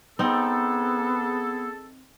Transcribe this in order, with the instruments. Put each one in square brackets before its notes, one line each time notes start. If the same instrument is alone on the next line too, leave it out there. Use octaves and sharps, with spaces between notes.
[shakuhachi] B3 [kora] C4 D#4 [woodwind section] G#4 A4